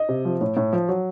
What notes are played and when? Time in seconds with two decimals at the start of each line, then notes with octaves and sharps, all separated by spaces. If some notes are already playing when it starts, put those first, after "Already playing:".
Already playing: D#5
0.09 C3
0.25 F3
0.41 A2
0.57 A2
0.73 F3
0.89 F#3